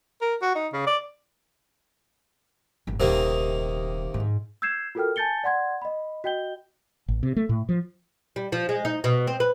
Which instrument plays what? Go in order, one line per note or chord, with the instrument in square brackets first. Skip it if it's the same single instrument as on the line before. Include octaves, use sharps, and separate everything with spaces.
[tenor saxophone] A#4
F#4
D#4
C#3
D5
[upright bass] G#1 A2
[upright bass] D#1 [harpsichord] C3 D#3 A#3
[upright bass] G#2
[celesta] E6 G6 G#6 C7 E7
F4 F#4 A4 A#4 G5 F6
G#5 A5 G6 A6 C#7 G7
D5 F#5 C6 G#6
D#5 B5
F#4 D#5 G5 G6 G7
[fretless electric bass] A1
C3
A3
A2
F3
[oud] G3
F3
G#3
D#4
B2
C4
B4